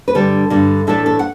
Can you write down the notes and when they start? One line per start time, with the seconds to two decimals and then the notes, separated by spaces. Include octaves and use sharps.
0.08 B4
0.14 G2 D3 G3 A4
0.50 G2 D3 G3
0.87 A2 E3 A3 D4 A4
1.06 A4
1.19 F#5